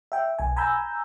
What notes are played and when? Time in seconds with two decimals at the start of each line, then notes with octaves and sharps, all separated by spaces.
0.12 E5 G5
0.39 B1 G#5
0.57 G#5 A#5 B5 E6 G6